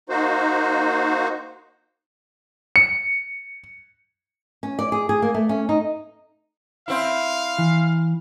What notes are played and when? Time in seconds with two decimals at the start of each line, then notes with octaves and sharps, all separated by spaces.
0.09 A#3 D#4 F#4 C5
2.76 C#7
4.63 C#4
4.79 D5
4.92 G#4
5.09 G#4
5.22 A#3
5.34 A3
5.49 C#4
5.69 D#4
6.88 C4 E4 F5
7.58 E3